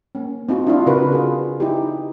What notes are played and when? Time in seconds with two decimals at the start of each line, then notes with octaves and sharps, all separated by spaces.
0.15 A#3 C#4
0.49 C4 D#4 F4 F#4
0.67 D4 E4 F4
0.86 C#3 F#4 A#4 B4
1.12 F4 G#4
1.60 D#4 E4 G4